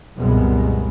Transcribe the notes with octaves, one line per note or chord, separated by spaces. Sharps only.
C2 F#2 A#2 G3 G#3 B3